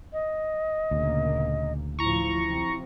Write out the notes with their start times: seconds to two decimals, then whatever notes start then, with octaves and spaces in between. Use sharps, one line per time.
0.13 D#5
0.91 D2 A#2 C#3 A#3
1.99 A1 F3 E4 A#5 C#6
2.47 C3 F3 C4